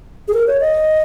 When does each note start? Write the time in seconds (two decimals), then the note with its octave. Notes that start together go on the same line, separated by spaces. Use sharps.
0.28 G#4
0.34 A#4
0.47 C#5
0.61 D#5